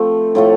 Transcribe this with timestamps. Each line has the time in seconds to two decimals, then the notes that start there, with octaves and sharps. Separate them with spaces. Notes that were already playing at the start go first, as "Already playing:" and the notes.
Already playing: F3 A3 C4
0.35 A2 F3 A3